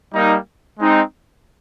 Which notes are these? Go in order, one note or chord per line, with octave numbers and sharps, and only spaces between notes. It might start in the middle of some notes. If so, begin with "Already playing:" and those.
G3 A#3 D#4
G#3 C4 D#4